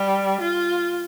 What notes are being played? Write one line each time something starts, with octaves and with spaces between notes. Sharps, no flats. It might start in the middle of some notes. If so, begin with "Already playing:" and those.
Already playing: G3
F4